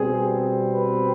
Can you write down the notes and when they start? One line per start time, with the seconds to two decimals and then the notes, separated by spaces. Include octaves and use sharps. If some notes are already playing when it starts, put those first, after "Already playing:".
Already playing: B2 G3 C4 G#4
0.72 B4